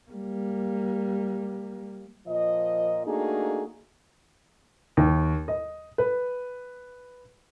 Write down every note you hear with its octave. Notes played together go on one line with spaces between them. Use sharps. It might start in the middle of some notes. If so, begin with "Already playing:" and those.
G3 A#3
A#2 F3 A#4 D#5
A3 A#3 D4 D#4 F#4 G#4
D#2
D#5
B4